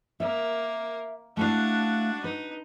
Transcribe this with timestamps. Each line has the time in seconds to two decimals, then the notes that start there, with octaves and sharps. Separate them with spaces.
0.20 A#3 A#4 E5
1.37 A3 D4 E4 F#4 F5
2.24 D#4 B4